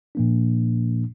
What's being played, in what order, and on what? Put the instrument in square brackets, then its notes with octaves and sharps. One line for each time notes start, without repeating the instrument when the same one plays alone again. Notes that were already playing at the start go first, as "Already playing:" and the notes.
[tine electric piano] A#2 F3 A#3 D4